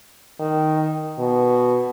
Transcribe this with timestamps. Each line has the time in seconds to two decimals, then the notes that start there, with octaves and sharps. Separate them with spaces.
0.40 D#3
1.19 B2